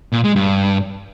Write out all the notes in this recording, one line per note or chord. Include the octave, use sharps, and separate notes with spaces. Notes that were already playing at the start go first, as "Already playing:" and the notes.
A#2
G#3
G2